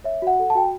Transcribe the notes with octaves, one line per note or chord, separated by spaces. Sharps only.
C#5 E5
F#4 F#5
A4
A5
F#4 G5